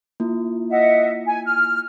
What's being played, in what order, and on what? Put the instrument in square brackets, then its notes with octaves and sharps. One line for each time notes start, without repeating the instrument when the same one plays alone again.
[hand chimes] A#3 E4 F4
[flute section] D#5 E5 F#5
G#5
F6